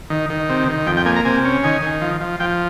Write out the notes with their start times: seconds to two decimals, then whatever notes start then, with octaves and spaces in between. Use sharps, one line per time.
0.10 D#3
0.30 D#3
0.49 C3
0.68 D#3
0.86 F2 G5
0.97 G5
1.05 A#3 G#5
1.16 A#5
1.25 C3 G#5
1.45 C#4
1.63 D#3 G#5
1.82 D#3
2.01 F3
2.21 F3
2.40 F3 G5